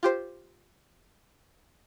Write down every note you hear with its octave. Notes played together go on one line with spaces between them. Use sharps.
F4 G4 C5